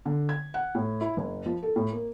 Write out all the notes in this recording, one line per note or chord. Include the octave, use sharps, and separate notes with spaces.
D3
G#6
F#5
A2
E4
F#1
F3
A4
A2
A#3